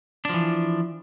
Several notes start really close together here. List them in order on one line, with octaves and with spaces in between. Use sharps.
D4 F3 E3